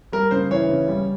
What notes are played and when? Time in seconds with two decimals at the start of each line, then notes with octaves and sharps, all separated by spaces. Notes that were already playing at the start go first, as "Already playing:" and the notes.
0.12 G3 A#4
0.31 C#3 C5
0.51 E3 C#5
0.69 C#3
0.88 G3